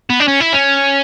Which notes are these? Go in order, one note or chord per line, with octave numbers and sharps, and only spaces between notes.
B3
D4
C#4
E4
C#4